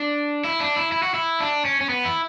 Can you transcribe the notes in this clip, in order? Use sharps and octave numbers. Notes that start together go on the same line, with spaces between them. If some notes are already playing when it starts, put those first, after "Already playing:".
Already playing: D4
E4
D4
E4
E4
F#4
E4
D4
C#4
C#4
B3
E4